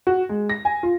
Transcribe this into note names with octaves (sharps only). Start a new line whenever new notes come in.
F#4
G#3
A#6
G#5
F4